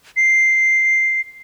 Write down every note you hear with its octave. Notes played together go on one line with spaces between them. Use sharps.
C7